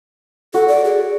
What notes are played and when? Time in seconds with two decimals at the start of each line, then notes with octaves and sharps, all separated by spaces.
0.54 F#4 A4
0.68 D5
0.85 G#4